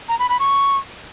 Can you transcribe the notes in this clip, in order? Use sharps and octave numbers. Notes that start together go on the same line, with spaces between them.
A#5
B5
B5
C#6